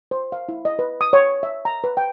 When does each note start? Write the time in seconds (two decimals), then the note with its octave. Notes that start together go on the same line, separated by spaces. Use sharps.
0.11 C5
0.32 F5
0.49 E4
0.65 D#5
0.79 B4
1.01 D#6
1.13 C#5
1.43 E5
1.65 A#5
1.84 B4
1.97 G5